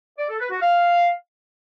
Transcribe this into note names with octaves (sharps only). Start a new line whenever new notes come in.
D5
A4
B4
F#4
F5